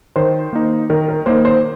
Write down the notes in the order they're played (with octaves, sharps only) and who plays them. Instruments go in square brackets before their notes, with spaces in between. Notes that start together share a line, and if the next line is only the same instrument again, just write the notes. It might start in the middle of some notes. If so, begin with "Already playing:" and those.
[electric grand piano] D#3 [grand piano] C5
[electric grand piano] A#3 D#4
[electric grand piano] D#3 [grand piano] A#4
[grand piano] A#4
[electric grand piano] A#3 D#4 [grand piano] C5
[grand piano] C5